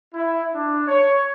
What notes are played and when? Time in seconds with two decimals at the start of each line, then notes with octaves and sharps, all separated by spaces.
0.14 E4
0.55 D4
0.87 C#5